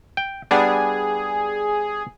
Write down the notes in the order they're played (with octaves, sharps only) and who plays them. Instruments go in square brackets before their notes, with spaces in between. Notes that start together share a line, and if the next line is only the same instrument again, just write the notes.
[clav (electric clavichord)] G5
[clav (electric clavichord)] G3 B3 D4 [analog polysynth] G#4